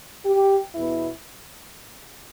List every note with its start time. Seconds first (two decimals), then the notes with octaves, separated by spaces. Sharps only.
0.25 G4
0.73 E2 B2 B3 E4